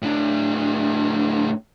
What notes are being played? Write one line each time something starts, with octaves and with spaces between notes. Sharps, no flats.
A2 D4